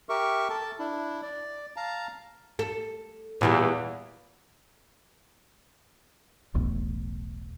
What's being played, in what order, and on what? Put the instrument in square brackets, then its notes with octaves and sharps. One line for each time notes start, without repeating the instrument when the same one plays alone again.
[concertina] G4 A#4 E5 C#6
A4 A5
D4 E4
D5
F5 A5 A#5
[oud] A4
[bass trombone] E2 [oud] A#2 E3 G3
[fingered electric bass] E1 B1 E2 A2